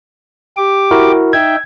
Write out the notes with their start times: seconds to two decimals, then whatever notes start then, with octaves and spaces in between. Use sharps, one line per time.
0.57 G4 D6
0.91 E4 F#4 A#4
1.33 D#4 E5 G5 G#6